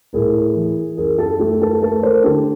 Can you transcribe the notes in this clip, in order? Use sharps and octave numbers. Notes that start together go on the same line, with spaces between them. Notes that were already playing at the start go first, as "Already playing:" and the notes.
A2 G#4 A#4
E3
F#2 G#4 A#4
G4 A4
A3 G4 A4
A4 B4
A3 A4 B4
A#4 C5
D3 G4 A4